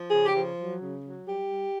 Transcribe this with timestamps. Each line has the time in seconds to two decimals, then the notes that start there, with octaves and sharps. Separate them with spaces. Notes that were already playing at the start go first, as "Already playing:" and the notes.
Already playing: F3
0.08 C#3 G#4
0.25 G4
0.36 F3
0.59 F#3
0.81 C#3
1.03 F#3
1.26 G3 G4
1.49 G3